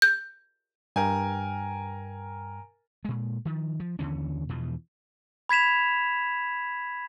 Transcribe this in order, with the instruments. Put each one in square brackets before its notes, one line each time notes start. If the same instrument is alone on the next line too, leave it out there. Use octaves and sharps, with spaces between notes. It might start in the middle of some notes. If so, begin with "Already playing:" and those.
[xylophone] G6
[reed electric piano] G2 G5 [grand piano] A#4 G#5
[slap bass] A#2 G#3
D#3 F3
F3
D#2 D3 E3 C#4
E2 B2 E3 F3
[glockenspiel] B5 G#6 B6 E7 F7